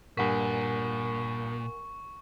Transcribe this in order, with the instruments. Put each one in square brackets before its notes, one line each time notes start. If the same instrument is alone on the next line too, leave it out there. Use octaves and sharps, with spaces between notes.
[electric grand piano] G2 B6 [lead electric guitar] A#2 [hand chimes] A#4 F#5 G#5 [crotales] C#6